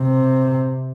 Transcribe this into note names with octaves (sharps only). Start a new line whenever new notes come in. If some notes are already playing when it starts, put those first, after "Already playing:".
Already playing: C3